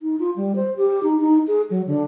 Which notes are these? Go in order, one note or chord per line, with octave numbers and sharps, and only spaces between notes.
D#4
F4
G3
C5
G4
D#4
D#4
G#4
F#3
D3